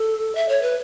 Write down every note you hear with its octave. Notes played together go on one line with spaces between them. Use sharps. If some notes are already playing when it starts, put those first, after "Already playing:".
Already playing: A4
E5
C#5
B4